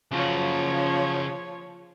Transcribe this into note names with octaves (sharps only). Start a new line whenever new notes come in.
C#3 F3 F#4 C#5